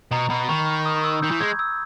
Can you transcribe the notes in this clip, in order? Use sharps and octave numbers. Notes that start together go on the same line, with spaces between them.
B2 A#5
B2 B5
D#3 C#6
D#6
E6
D#3 G6
E3
G#3 G#6
E6